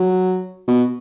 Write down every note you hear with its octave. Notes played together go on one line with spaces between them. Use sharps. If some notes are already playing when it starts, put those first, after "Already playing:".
Already playing: F#3
B2